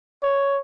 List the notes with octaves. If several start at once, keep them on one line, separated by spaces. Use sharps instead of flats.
C#5